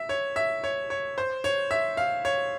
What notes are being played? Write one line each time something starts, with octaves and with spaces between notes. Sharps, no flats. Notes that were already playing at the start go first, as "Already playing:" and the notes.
Already playing: E5
C#5
E5
C#5
C#5
C5
C#5
E5
F5
C#5